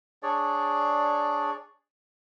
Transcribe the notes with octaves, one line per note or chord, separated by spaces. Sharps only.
D4 G#4 C#5 D5